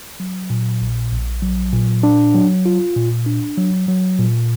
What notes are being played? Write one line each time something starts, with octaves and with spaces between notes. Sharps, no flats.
F#3
A#2
A#1
A#1
F#3
A#2
D4
F#3
F4
A#2
D4
F#3
F#3
A#2